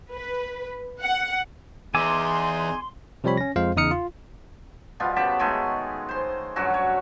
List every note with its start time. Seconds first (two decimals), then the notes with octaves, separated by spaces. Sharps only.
0.11 B4
1.01 F#5
1.95 E2 D#4 G#4 G#5 C6 D6 E6
3.24 C3 F3 G3 C4 C#5 B5
3.37 C#4 A#6
3.56 F2 G#3 F4 C5 F5
3.76 E2 C#3 D#4 D#6 F6 C#7
3.91 F4
5.00 B2 G3 B3 F4
5.16 C#3 G4 A5 B5
5.39 D#3 G#3 A3 G#5
6.09 C5 C6
6.56 G2 F#3 C#4 F#4
6.74 C#5